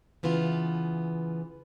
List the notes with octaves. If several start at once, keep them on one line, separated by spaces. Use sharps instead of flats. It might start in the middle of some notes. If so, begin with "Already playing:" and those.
C#3 E3 B3 F4